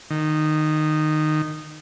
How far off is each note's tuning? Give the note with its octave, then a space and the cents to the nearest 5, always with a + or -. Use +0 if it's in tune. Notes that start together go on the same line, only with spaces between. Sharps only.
D#3 -15